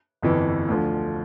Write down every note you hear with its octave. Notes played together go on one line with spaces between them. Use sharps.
G1 F2 E3
D2 D3 F3